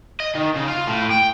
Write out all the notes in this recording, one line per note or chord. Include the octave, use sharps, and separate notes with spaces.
D#5
D#3
C#3
F4
A2
G5